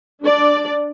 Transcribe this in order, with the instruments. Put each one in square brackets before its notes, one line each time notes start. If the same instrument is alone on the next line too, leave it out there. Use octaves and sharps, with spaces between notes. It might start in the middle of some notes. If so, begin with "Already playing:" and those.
[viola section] D4 D5